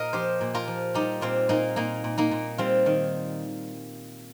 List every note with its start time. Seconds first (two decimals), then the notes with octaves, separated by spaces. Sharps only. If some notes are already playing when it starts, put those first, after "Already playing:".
Already playing: A#2 A#4 D#5 F5
0.13 F3 G4 C5
0.41 A#2
0.55 F4 A#4
0.68 F3
0.94 G3 D#4 G4
1.21 A#2 C4 F4
1.49 A#2 A#3 D#4
1.76 A#2 A#3 D#4
2.04 A#2
2.18 A#3 D#4
2.31 A#2
2.58 G3 C4 F4
2.86 D#3